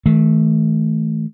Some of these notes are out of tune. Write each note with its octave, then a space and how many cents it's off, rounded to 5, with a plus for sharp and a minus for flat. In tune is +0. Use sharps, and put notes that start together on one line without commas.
D#3 +45 A3 -15